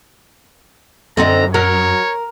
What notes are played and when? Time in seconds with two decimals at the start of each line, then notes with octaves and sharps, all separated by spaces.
1.17 F#2 D3 C4 D#4 A#5
1.54 F#3 A#4 C#5